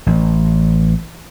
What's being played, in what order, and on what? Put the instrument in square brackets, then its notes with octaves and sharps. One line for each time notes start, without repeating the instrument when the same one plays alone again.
[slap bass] A1